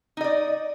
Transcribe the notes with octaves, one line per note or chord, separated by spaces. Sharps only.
D#4 D5 D#5